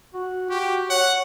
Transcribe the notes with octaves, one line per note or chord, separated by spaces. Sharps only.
F#4
F#4 G4
C#5 F#5